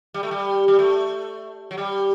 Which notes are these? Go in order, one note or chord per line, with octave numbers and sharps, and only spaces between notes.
G3
A3
G3
G3
A3
F#3
G3